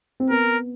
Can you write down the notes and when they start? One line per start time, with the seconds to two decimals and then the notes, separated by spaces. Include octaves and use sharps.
0.20 C4
0.30 B3 A#4